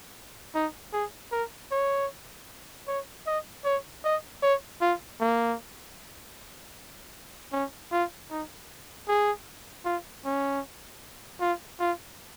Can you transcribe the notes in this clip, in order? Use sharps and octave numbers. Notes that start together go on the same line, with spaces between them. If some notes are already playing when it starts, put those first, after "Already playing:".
D#4
G#4
A#4
C#5
C#5
D#5
C#5
D#5
C#5
F4
A#3
C#4
F4
D#4
G#4
F4
C#4
F4
F4